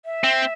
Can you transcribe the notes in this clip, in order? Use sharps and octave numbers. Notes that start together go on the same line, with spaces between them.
E5
C4